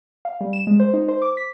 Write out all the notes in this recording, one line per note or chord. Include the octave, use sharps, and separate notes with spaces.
F5
G3
E7
G#3
C5
D#4
C5
D6
B6